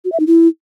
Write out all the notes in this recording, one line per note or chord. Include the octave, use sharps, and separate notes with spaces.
F#4
E5
D#4
E4